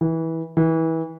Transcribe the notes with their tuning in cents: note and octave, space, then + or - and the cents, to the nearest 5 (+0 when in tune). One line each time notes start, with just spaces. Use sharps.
E3 -20
E3 -25